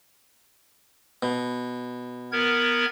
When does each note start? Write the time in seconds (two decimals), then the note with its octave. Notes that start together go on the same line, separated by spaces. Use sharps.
1.23 B2
2.32 B3 A#4 G#6